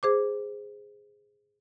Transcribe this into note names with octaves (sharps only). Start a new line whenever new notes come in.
G#4 C5 D6